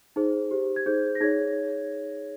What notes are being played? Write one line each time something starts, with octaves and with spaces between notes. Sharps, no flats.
D#4 G#4 C5
G4 C5
G#6
D#4 G#4 C5 G6
A#6
D#4 G#4 C#5 G#6